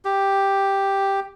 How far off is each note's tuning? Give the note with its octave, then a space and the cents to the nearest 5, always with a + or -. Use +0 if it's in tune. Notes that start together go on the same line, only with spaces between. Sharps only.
G4 +0